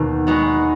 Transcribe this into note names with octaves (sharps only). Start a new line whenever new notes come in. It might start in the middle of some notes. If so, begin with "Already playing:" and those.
Already playing: D#2 B2 D#3
G#3 B3 D#4 F#4